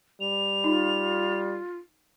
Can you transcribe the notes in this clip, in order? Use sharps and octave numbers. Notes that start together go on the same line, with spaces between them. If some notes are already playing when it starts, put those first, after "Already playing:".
G3 F7
D#4 F4